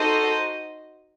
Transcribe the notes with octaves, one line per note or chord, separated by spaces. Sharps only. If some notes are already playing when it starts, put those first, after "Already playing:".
Already playing: D#4 F#4 A4 C5 D#5